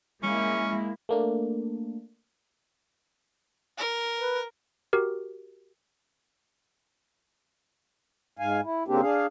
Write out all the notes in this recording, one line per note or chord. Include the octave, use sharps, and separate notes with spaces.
G#3 A#3 C#4 E4
A3 A#3 D4
A#4
B4
F#4 G4 A#4
G#2 F5 G#5
E4
C#3 A#3 C4 D4 G4
D4 G#4 F5